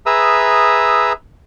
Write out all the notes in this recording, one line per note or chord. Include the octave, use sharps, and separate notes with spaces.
G#4 B4 E5 A#5 D#6 E6